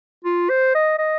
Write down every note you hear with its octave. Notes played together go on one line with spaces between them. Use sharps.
F4
C5
D#5
D#5